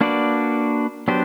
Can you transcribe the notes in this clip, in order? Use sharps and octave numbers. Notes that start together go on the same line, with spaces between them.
A#3 D4 F#4 B4 D5
F#3 B3 D4 G4 C5